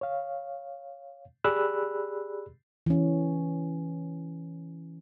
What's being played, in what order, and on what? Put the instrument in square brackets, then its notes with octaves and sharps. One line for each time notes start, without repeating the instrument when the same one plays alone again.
[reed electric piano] C#5 F5
G4 G#4 D5 B5 E6 F#6
[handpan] E3 C#4